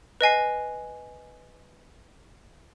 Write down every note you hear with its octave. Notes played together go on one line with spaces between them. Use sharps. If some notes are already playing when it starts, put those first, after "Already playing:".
B4 D#5 G#5 C7